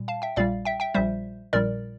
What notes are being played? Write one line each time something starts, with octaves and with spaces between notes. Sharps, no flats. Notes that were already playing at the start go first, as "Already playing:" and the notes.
Already playing: A#2 G3
F5 A5
E5 G5
A#1 A#2 G3 D5 F5
E5 G5
E5 G5
A#1 A#2 G3 C5 E5
A#1 A#2 G3 A#4 D5